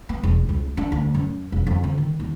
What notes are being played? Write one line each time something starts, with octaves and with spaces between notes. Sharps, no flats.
B3
E1
C#2
D4
D2
F#2
E1
F2
D3
D#3
D#2